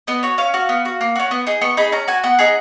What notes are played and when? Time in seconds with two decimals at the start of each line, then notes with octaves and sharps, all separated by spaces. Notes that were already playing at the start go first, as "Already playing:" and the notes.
0.07 B3 D#5
0.23 F#4 C#5
0.38 C#4 F5
0.54 F#4
0.69 B3
0.85 F#4
1.01 A#3
1.16 C#4 F#4
1.31 B3
1.47 D#4 G#4
1.61 B3 C#6
1.77 D#4 G#4 B5
1.92 C#4 A#5
2.08 F#4 G#5
2.23 B3 F#5
2.39 D#4 G#4